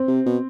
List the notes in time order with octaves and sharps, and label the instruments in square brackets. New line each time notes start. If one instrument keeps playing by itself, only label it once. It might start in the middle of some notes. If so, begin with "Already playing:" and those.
Already playing: [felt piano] C4
[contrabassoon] C3
B2